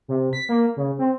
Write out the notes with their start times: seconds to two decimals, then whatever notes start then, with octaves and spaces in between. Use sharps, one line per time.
0.08 C3
0.33 B6
0.49 A#3
0.77 C#3
0.99 C4